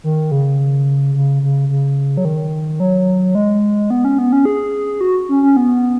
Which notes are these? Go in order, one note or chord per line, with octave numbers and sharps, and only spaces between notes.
D#3
C#3
C#3
C#3
C#3
F#3
D#3
F#3
G#3
B3
C#4
B3
C#4
G#4
F#4
C#4
C#4
B3